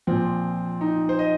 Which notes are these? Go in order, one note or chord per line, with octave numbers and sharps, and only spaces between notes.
A#2 F3 C4
D#4
C5
D#5